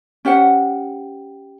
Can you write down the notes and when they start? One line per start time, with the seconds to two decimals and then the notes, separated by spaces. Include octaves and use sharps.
0.25 C#4 G4 C5 F#5